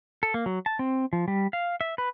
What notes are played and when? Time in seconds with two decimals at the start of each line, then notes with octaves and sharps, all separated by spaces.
0.23 A4
0.34 A#3
0.46 F#3
0.66 A5
0.79 C4
1.13 F3
1.28 G3
1.53 F5
1.81 E5
1.98 B4